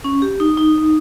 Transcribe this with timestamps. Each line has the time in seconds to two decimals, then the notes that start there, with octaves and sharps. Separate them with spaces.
0.04 C#4
0.22 G4
0.40 D#4
0.58 D#4